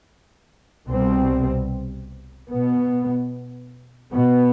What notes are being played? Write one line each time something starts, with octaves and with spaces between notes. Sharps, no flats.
C2 B2 G3 C4
B2 B3
B2 B3